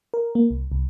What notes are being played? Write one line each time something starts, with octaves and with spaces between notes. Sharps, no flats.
A#4
A#3
C2
C2